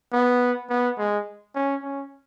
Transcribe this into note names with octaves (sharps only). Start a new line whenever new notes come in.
B3
B3
G#3
C#4
C#4